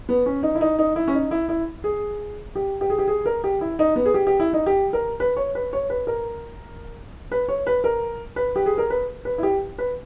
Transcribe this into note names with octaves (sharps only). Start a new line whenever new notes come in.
B3
C#4
D#4
E4
D#4
D#4
E4
C#4
D#4
E4
E4
G#4
G4
G4
G#4
G4
G#4
A#4
G4
E4
D#4
B3
G#4
G4
G4
E4
D#4
G4
A#4
B4
C#5
B4
C#5
B4
A#4
B4
C#5
B4
A#4
B4
G4
G#4
A#4
B4
B4
E4
G4
B4